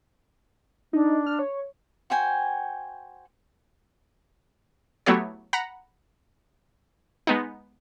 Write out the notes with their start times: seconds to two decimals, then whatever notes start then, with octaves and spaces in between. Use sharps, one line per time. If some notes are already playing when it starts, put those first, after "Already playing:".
0.93 D4 D#4
1.26 F6
1.39 C#5
2.10 F#4 C5 G5 G#5
5.06 F#3 A3 B3 E4 G4 C#5
5.53 F#5 A#5 B5 A#6
7.27 G#3 B3 D#4